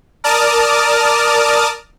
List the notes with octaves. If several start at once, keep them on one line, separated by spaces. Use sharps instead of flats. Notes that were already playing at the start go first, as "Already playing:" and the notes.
A#4 D5 A5 D6 D#6 F6